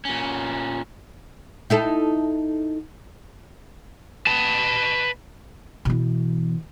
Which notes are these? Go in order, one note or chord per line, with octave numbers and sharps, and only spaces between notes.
A#2 C#4
D#4 E4 A4
B4 A5
B2 E3